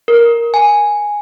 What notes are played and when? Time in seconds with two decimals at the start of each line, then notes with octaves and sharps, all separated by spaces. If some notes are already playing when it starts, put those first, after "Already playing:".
0.08 A#4
0.54 G#5